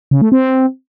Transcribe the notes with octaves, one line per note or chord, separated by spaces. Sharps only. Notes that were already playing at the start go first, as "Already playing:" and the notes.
C#3
A3
C4